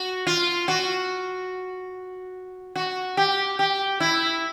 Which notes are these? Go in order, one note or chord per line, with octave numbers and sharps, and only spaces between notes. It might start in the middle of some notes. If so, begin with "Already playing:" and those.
Already playing: F#4
F4
F#4
F#4
G4
G4
E4